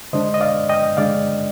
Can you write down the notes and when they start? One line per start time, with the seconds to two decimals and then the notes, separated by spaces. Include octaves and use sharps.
0.13 D3 G#3 D4 C5 D#5
0.34 D#5
0.41 D5 F5
0.69 D#5 G5
0.97 D3 G#3 D4 D5 F5